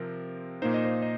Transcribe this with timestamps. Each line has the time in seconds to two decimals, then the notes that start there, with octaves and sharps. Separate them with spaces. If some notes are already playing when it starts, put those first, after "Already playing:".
Already playing: C3 F3 C4 A#4
0.62 A#2 A#3 D#4 C5
0.74 D#5
0.85 C5
1.02 D#5